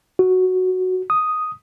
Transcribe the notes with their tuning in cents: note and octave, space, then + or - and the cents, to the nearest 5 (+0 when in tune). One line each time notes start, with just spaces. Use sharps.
F#4 +0
D#6 +0